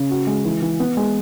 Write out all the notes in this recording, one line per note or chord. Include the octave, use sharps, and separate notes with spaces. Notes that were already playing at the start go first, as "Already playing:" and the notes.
Already playing: C#3
F#4
G#3
E3
E3
B3
G#3